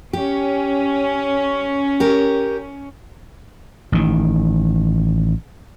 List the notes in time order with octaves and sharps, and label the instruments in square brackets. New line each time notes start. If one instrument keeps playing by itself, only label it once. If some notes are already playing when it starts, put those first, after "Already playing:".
[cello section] C#4 [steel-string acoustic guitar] G4
[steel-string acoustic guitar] G4 A#4
[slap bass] A1 D#3